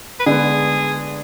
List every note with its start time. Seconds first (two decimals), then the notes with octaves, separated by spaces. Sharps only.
0.20 B4
0.26 D3 G#3 B3 G#4